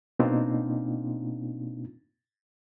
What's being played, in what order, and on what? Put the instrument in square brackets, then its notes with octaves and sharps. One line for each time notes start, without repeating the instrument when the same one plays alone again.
[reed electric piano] B2 A#3 C4 D4 D#4 F4